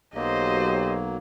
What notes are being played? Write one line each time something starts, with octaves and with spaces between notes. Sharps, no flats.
B1 F#3 A#3 G4 C5 D#5